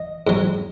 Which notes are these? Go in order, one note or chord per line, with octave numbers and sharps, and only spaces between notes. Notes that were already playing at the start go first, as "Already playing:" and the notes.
Already playing: D#5
G#2 F#3